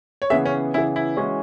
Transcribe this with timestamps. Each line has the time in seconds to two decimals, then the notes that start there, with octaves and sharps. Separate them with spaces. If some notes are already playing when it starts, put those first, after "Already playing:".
0.22 C#5
0.30 C#3 E3 B3 G#4 E5
0.46 C#4
0.74 C#3 E3 B3 E4 G#4
0.96 E4
1.17 E3 G#3 C#4 F#4